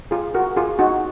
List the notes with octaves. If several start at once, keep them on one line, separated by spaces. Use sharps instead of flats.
F4 G#4
F#4 A#4
F4 G#4
D#4 F#4